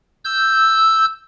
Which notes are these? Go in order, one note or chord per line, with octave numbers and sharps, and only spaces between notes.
E6 G6